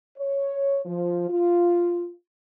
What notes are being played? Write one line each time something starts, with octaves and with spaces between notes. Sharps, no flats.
C#5
F3
F4